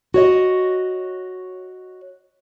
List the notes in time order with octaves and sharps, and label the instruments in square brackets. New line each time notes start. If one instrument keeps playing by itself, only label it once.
[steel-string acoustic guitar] F#4 C#5 D#5